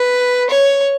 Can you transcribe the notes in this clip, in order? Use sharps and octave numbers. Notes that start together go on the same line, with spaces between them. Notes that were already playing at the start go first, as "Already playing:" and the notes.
Already playing: B4
C#5